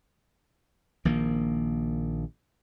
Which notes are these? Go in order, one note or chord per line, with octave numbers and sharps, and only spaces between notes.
A#1 D#3 A#3